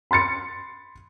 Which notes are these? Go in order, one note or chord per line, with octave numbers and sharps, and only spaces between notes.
B5 C6 A6 C#7